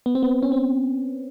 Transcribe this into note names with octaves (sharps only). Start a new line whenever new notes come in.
B3
C4
B3
C#4
C4